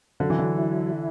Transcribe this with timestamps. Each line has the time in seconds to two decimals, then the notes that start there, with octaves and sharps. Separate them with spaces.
0.20 D3 F#3
0.30 E3
0.39 D3
0.58 E4